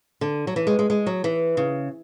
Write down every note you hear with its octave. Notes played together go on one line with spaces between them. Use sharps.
D3
F#3
E3
G#3
G#3
G#3
F#3
E3
C#3